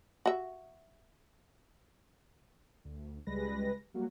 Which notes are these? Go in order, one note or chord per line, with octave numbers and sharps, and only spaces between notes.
F#4 E5
D2
C#2 G3 G#3 B4 A#6
F#3 G3 A#3 F#4